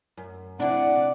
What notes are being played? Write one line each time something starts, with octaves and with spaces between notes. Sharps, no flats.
F#2
C3 D4 E4 D5 F#5